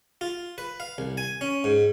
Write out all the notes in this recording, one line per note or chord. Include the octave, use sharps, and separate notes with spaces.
F4
B4
F5
C2
G#5
C#4
G#2